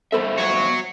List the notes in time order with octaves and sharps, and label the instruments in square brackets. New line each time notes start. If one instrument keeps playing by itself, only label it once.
[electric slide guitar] G2 B3 E5 [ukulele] A4 C5 B5
[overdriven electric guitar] F#4 C#5